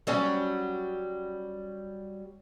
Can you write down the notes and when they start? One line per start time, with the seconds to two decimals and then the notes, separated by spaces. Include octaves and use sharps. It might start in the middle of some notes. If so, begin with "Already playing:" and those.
0.07 F#3 G3 C#4